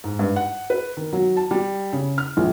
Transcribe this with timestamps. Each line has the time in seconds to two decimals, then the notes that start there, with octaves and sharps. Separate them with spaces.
0.04 G#2
0.19 G2
0.36 F#5
0.70 B4
0.97 D#3
1.13 F#3
1.37 A5
1.51 G3
1.93 C#3
2.18 F6
2.37 A#1